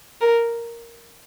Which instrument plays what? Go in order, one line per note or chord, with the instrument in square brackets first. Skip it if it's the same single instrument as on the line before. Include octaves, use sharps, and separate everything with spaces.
[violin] A#4